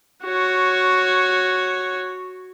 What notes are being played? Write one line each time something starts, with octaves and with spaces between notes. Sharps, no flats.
F#4 C#5